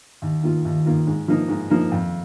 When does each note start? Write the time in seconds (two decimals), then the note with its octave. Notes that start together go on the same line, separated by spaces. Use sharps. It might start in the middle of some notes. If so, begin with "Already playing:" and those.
0.22 D#2
0.43 D#3 A#3 F4
0.65 D#2
0.86 D#3 A#3 F4
1.07 G#2
1.28 F3 A#3 D#4
1.48 G#2
1.70 F3 A#3 D#4
1.92 F2